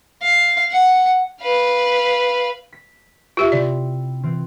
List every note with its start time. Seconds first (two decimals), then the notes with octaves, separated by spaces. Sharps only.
0.22 F5
0.72 F#5
1.42 B4 F5
2.73 B6
3.37 F4 G4 E5
3.52 C3 C4 E4 D5
4.23 E3 C4 F4